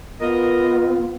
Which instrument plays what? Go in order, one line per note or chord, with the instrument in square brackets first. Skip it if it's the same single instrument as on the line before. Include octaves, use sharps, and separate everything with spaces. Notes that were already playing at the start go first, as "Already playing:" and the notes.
[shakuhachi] B3 [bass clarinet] F4 [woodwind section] A#4 D#5